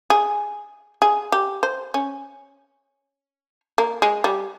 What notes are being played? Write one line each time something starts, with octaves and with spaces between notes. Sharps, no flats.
G#4
G#4
G4
C5
C#4
A#3
G#3
G3